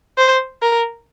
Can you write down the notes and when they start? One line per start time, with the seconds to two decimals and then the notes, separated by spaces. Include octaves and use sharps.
0.18 C5
0.62 A#4